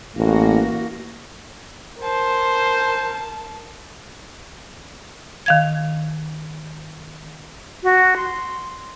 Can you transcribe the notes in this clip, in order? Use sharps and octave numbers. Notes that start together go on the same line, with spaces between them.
A1 A#3 F#4
A#4 C5 A5
D#3 F5 G#6
F#4
C6